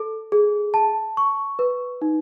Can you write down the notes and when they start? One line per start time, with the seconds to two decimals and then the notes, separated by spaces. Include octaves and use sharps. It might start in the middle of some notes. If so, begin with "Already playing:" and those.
Already playing: A4
0.32 G#4
0.74 A5
1.17 C#6
1.59 B4
2.02 D#4